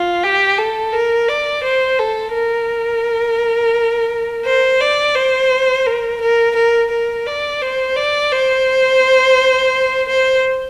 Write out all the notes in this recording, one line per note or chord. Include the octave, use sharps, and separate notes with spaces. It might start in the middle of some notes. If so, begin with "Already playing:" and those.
Already playing: F4
G4
A4
A#4
D5
C5
A4
A#4
C5
D5
C5
A#4
A#4
A#4
A#4
D5
C5
D5
C5
C5